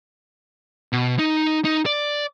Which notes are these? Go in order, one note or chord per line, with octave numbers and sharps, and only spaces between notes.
B2
D#4
D#4
D5